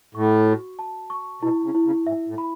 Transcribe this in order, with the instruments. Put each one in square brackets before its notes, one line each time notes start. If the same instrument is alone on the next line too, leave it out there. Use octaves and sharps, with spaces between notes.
[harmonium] A2 [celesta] C#6
[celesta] F#4
A5
C#6
[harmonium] B2 [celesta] E4
[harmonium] C#3
[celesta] E4
[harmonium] C#3
[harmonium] G#2 [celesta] E5
[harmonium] A2
[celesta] B5